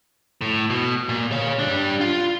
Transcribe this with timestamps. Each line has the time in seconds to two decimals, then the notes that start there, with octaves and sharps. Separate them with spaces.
0.41 A2
0.70 B2
1.09 A#2
1.32 C#5 F5
1.59 G3 D4
2.01 F4